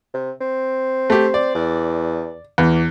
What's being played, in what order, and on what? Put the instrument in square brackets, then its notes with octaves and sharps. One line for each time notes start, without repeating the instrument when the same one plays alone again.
[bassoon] C3
C4
[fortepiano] A3 G4
D5
[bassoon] E2
[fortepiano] E2 [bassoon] E3